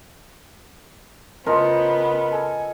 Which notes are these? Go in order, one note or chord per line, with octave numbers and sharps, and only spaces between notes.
C#3 G#3 B3 F4 A#4 C5 D#5 A5
A4 G#5